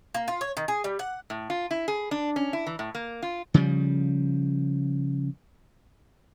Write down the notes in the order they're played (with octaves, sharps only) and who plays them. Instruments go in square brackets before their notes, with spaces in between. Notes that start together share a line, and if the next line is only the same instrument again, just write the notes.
[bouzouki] A#3
F4
C#5
D#3
G#4
G3
F#5
[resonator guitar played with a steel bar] A2
F4
E4
G#4
D4
C#4
E4
E3
A2
A#3
F4
[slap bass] C#3 F3 G3